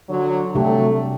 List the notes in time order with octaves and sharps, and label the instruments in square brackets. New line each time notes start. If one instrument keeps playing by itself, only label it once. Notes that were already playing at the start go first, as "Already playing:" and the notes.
[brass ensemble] D3 F#3
[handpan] C3 G3 D4 G4 [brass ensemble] F#3 A3